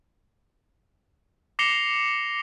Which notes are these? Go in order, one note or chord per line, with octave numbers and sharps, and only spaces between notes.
D6 A#6 C7 C#7 F7 G7